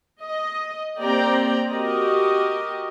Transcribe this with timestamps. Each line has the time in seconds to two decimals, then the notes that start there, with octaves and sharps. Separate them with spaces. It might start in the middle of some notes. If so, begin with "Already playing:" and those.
0.21 D#5
1.00 A#3 C4 G4 D5 G5 A#5
1.70 F#4 G4 A#4 D#5